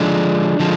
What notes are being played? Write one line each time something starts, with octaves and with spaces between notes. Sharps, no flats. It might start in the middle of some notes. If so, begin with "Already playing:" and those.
Already playing: D3 F3 G#3 D4
D3 F3 G#3